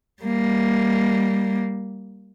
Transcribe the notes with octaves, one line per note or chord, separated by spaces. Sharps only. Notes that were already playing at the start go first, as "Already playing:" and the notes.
G3 A#3